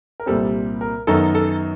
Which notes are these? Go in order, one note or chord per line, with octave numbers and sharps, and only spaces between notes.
A#4
C2 A#2 G3 C4 A4
A#4
F#2 D#3 F#3 B3 D#4 A4
A4